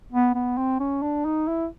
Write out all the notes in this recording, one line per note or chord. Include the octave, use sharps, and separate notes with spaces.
B3
B3
C4
C#4
D4
D#4
E4